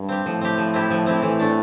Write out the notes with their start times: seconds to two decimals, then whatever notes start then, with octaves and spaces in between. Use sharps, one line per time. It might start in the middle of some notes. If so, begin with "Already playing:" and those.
Already playing: G2
0.09 C4 G4
0.25 A2 F3
0.41 C4 G4
0.58 F3
0.74 C4 E4 G4
0.90 F3
1.06 C4 E4 G4
1.22 A2 E3
1.39 A3 D4